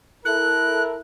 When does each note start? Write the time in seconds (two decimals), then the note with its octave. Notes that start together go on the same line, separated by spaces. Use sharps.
0.25 E4 A4 A#4 F#6